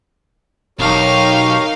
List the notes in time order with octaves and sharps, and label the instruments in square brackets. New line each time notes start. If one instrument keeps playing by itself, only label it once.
[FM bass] E1 [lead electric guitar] B1 [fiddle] D#4 F5 [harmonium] G4 A#4 C#5